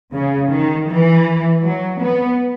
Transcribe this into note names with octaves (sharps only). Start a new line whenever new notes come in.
C#3
D#3
E3
F#3
B3